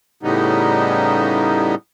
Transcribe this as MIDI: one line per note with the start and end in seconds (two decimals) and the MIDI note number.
0.23 1.75 45
0.23 1.75 49
0.23 1.75 55
0.23 1.75 59
0.23 1.75 63